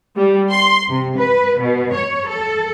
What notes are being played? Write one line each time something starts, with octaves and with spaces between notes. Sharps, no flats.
G3
C6
C3
B4
B2
C#5
A4